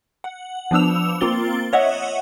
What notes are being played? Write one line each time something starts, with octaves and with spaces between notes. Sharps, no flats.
F#5
F3 B3 D4 E6 F7
A#3 C4 F4 A6 G7
C#5 D#5 E5 F#5